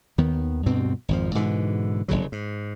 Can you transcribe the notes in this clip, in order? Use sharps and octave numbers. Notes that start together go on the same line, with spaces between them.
D#2 D#3 B3
D2 G2 B2 C4
G#1 F2 F3
G#2 B2 D3 E3
F1 C2 C#3 F#3
G#2